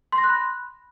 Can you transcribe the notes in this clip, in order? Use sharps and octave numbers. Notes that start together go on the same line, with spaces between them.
C6
A#6
F#6
B5